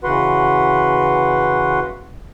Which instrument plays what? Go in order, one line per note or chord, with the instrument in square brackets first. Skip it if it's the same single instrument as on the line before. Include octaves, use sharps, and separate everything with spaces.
[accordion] C#3 E3 F#4 B4 F#5 C6